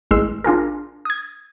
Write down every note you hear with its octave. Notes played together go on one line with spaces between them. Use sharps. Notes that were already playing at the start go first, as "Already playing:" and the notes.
A1 G#3 C6 E6
D4 F4 G#4 A#4
D#6 G#6